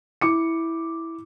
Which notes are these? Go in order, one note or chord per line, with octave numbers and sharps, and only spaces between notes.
E4 D6 C#7